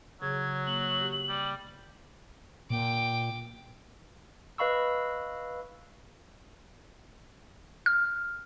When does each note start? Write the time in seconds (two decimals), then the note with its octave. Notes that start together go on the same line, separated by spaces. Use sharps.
0.22 C#3 F#3 G#4 G#6
0.67 A#3 F#7
1.01 G4
1.29 G3
2.70 A#2 G5 D6
4.58 B4 D#5 F5 B5 C#6 E6
7.86 F6